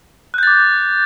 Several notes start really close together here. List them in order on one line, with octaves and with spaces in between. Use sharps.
F#6 G6 A6 D6